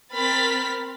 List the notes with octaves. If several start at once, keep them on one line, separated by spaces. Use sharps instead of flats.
C4 A#4 B5 F6 A6 B6